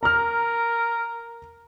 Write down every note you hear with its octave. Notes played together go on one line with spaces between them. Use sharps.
A#4 A#5 F6